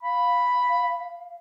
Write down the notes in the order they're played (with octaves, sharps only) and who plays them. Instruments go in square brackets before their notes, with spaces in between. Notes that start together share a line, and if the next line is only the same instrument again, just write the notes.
[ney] F5 [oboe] B5